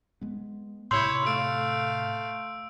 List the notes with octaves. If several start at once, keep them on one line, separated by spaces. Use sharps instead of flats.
G#3 B3
A2 C3 E4 C#5 C6 E6 G6
A3 F5 E6 D7